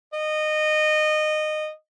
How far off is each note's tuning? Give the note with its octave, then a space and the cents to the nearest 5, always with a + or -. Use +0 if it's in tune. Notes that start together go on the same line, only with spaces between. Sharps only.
D#5 -20